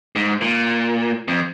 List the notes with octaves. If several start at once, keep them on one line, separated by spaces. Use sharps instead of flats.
G#2
A#2
F2